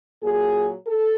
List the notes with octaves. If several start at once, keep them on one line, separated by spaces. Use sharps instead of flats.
A#2 F#3 A#3 G#4
A4